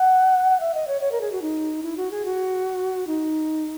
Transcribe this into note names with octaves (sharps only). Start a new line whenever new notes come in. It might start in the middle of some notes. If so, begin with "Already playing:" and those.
Already playing: F#5
E5
D#5
C#5
C#5
A#4
G#4
F#4
D#4
E4
F#4
G#4
F#4
D#4